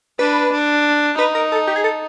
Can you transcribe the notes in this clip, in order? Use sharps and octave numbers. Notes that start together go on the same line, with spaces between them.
D4 B4
D4
D#4 B4
A#4
A4
G4
G#4
A4